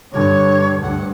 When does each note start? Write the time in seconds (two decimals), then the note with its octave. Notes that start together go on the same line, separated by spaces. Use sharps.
0.12 G2 D3 C#5
0.82 D2 G2 F#5